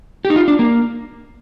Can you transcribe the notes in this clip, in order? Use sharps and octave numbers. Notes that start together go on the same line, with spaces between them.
G4
D#4
F4
D4
A#3